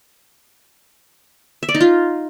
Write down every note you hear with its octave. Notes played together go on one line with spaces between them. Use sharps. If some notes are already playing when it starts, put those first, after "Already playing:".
E5
D5
D#4
F4